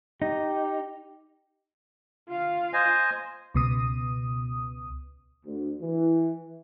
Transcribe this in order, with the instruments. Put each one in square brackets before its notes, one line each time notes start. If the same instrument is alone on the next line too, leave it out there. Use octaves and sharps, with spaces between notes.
[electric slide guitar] D#4 [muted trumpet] G4
[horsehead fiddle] F4 F5
[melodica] C5 D#5 G#5
[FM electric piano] C#2 B2 D#6
[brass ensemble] D2
E3